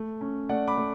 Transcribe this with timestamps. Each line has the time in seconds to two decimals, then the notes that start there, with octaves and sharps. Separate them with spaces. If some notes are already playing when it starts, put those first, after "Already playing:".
Already playing: A3
0.21 C#4
0.49 A3 D5 F#5
0.68 B5 D6
0.77 A3